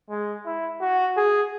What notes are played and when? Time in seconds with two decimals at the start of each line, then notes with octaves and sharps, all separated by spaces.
0.10 G#3
0.46 E4
0.81 F#4
1.17 G#4